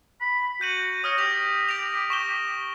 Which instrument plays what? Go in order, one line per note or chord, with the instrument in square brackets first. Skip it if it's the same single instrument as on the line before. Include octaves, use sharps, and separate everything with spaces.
[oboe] B5
[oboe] F#4 [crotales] G6 D#7 F#7
[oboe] C#5 [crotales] D#6 F6 A#6
[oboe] G4 [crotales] A#6 F7
[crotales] A#6 D7 F7
C#6 E7 G7